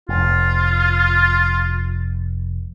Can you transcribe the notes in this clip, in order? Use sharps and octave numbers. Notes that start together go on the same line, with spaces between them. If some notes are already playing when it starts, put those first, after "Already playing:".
F1 F4